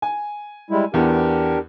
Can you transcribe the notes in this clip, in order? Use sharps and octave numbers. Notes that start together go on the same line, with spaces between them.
G#5
G3 G#3 E4
E2 B3 D4 G4 A#4